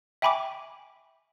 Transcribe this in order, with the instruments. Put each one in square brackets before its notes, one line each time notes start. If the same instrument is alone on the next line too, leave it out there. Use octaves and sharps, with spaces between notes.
[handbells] E5 G5 G#5 B5 C#6 D6